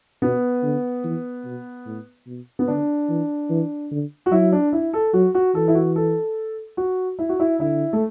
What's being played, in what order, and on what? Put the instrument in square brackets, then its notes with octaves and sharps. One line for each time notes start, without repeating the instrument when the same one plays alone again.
[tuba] B2 [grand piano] B3
[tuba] D3
E3
B2
A2
B2
[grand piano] B3
[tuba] D3 [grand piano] D4
[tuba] E3
E3
D3
[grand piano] F#4
[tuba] F#3 [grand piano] E4
[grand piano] D4
E4
A4
[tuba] F#3 [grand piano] F#4
[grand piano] F#4
[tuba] E3 [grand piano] A4
[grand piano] E4
F#4
A4
F#4
E4
F#4
E4
[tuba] D3 [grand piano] E4
[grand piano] A3